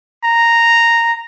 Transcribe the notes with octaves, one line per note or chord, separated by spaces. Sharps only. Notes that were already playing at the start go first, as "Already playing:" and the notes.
A#5